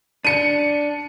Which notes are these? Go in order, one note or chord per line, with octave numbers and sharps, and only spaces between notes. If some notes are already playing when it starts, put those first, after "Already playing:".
D4 C#7 D#7